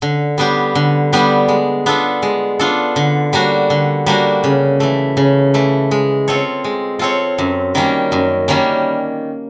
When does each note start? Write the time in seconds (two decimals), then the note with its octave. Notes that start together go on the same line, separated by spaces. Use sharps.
0.02 D3
0.38 G3 B3 D4 G4
0.75 D3
1.13 G3 B3 D4 G4
1.48 G#3
1.86 B3 D4 F4 A4
2.22 G#3
2.59 B3 D4 F4 A4
2.96 D3
3.33 G3 A#3 D4 F#4
3.70 D3
4.06 G3 A#3 D4 F#4
4.44 C#3
4.80 E3 A3
5.17 C#3
5.54 E3 A3
5.91 G#3
6.28 C4 F4 A4 C#5
6.64 G#3
6.99 C4 F4 A4 C#5
7.38 F#2
7.75 D#3 G3 A#3 C#4
8.12 F#2
8.48 D#3 G3 A#3 C#4